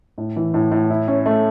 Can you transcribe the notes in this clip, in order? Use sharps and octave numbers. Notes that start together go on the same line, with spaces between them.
A2
E3
A2
A2
E4
C#4
A3